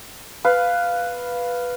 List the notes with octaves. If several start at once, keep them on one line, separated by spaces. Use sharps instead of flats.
B4 F5